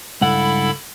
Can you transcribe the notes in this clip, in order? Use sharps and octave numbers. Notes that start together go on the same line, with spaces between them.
C#2 G2 E4 A4 F#5 B5